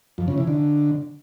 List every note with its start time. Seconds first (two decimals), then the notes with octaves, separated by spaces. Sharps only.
0.18 F2
0.28 C#3
0.38 E3
0.47 D3